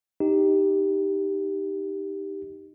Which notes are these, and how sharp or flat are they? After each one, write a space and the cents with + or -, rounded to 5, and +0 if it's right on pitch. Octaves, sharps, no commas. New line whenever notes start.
D#4 +0 G4 +0